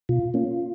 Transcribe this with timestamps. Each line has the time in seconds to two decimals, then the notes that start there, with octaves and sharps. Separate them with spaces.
0.09 B2 F4
0.34 A#3 C#4